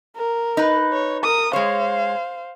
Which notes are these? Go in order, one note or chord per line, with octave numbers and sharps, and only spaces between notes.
A#4
D#4 B4
C#5
A#4 D#6
G#3 C5 C#5 F5